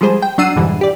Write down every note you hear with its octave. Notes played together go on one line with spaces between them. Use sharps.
F3 G3 G#3 G#4 C5
G5
F#3 D4 F#5 E6 C7 D#7
F2 G#2 B2 D3 E3 G3
G4 D5